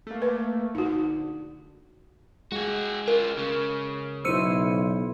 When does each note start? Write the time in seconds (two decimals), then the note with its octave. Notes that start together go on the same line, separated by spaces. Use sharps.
0.07 A3 A#3
0.22 B4
0.75 A#1 D3 D#4 F#4
2.52 G#3 F#4 G#4
3.08 F4 G#4 A#4
3.38 C#3
4.25 B1 E4 C5 E6 C#7 D#7